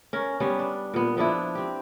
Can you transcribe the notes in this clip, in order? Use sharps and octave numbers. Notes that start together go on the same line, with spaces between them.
C#4 A#4
G3 B3 C#4
D4
A#2 B3
F3 B3 D4 E4
C4 G4